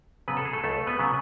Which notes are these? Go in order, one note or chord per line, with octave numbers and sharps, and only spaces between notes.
C#3 F#3 B3 B4
A4
G#4
A3 A4
C#2 A3 A4
B3 B4
C#3 F#3 B3